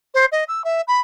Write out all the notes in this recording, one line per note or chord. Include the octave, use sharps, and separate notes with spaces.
C5
D#5
E6
E5
B5